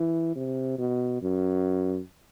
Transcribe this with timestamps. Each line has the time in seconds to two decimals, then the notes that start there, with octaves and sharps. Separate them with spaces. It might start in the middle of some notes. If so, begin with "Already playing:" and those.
Already playing: E3
0.36 C3
0.78 B2
1.22 F#2